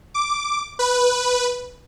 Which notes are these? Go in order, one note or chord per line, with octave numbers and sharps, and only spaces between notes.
D6
B4